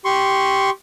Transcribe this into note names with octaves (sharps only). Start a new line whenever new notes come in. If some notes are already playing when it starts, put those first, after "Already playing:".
G4 C6 C#6